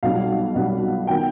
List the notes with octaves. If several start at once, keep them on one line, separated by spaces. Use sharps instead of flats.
B1 B2 G3 B3 F5
B1 B2 G3 B3
D#3 B3 G5